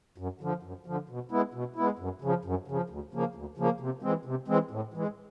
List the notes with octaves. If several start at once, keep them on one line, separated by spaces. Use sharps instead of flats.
F#2
D3 F3
F#2
D3 F3
B2
G#3 B3 E4
B2
G#3 B3 E4
F#2
C#3 F3
F#2
C#3 F3
D2
C#3 F3 A#3
D2
C#3 F3 A#3
C3
E3 G#3 C4
C3
E3 G#3 C4
A2
E3 G#3